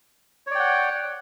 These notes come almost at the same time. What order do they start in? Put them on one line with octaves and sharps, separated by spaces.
C#5 D5 G5 F#5